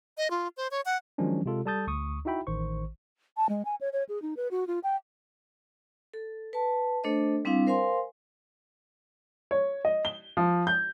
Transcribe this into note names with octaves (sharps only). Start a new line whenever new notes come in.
D#5
F4
C5
C#5
F#5
D#3 F3 F#3 G#3 C#4 D4
C3 G#3 F4 A4
G3 A4 A5 D#6 G6 A6
D2 C#6 D#6
D#4 E4 F#4 E5 G5 B5
A1 D#3 C5 C#6
A5
G#3
G#5
C#5
C#5
G#4
D#4
B4
F#4
F4
G5
A4
B4 A5
A3 D4 A4 C5 D#5
G3 C4 D4 E4 F5
A#4 C5 F5 G#5 C6
C#5
D#5
G7
F3
G6